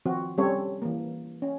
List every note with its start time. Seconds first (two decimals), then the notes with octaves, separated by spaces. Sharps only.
0.05 D#3 F3 C4 F#4
0.38 G3 C4 C#4 A4 C#5
0.82 E3 A#3
1.42 C#4